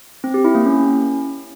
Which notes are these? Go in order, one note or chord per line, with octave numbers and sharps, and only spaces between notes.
C4
G4
E4
A#3
C#4